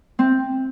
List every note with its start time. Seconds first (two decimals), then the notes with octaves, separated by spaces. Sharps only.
0.19 C4